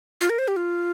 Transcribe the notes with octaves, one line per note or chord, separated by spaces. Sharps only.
F4
A#4
C5
G4
F4